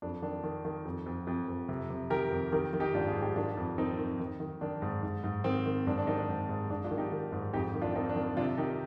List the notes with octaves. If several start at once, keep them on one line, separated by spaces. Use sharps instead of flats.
F2 D4
D#3 D4
D#3
D#3
F2
F2
F2
F2
C3
C3
D#3 G4 A#4
F2
D#3 G4 A#4
D#3
D#4 G4
G#2 D4 F4
F4 G#4
G#2
D#4 G4
D#3 D4 F4
F2
D#3 C4 D#4
D#3
D#3
D#3
D#3 D4
G#2
G#2
G#2
D#3 C4
D#3
G#2 D4
D4
D#3 C4 D#4
D4
G#2
G#2
G#2 D4
D4 F4
D#3
D#4 G4
D#3
G#2
F2 D#4 G4
D#3
D4 F4
D#3 C4 D#4
D4
D#3
D4
C3 D4 F4
D#3 D#4 G4